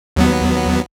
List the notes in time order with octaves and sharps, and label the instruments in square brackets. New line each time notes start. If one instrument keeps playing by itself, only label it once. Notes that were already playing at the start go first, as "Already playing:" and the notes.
[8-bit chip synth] D#2 F#3 B3